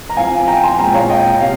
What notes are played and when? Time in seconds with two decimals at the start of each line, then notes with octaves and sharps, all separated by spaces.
0.09 A#5
0.17 F3 C4 F5 G#5
0.48 G5 A#5
0.63 G#5 C6
0.79 A#2 G#3 C4 G5 A#5
0.94 C#5 F5
1.09 D#5 G5
1.41 C3 F5